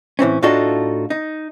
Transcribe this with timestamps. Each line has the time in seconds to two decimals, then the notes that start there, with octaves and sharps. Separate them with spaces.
0.19 A2 E3 C4 C#4
0.42 A2 D4 D#4 F4 F#4 A4
1.10 D#4